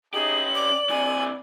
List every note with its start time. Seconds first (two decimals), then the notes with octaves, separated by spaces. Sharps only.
0.14 C#4 D#4 G4 G#4 F#7
0.55 D5 D6
0.89 C3 E3 G#5